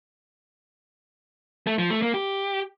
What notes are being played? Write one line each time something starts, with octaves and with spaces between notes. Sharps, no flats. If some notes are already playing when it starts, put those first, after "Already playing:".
A3
F3
A3
A#3
G4